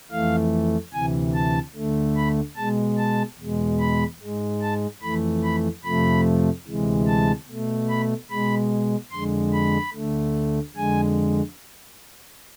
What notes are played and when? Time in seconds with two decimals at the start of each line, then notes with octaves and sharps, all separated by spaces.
0.11 F2 E3 A3 F5
0.93 D2 C3 E3 G#5
1.34 A5
1.75 D2 D3 A3
2.16 B5
2.56 B2 G#3 A5
2.98 A5
3.39 E2 B2 G#3
3.80 B5
4.21 G#2 G#3
4.62 A5
5.02 F2 E3 A3 B5
5.44 B5
5.84 F2 C3 F3 A3 B5
6.66 D2 C3 E3 G#3
7.07 A5
7.48 B2 A3
7.89 B5
8.30 B2 G#3 B5
9.12 F2 D3 G#3 C6
9.53 B5
9.93 D2 D3 A3
10.76 F2 D3 G#3 G#5